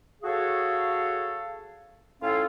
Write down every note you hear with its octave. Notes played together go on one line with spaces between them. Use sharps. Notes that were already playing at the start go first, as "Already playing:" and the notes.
F#4 G#4 A4 C#5 F5
A2 C#4 F4 A4 F5